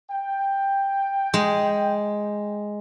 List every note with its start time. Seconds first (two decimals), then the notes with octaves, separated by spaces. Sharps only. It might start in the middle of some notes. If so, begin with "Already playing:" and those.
0.11 G5
1.34 G#3